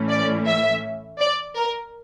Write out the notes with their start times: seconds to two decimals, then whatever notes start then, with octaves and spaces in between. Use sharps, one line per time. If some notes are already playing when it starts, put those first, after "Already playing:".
Already playing: A2 E3 A3 C#4
0.09 D5
0.47 E5
1.19 D5
1.56 A#4